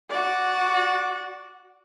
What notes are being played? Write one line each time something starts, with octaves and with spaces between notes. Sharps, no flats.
F#4 D5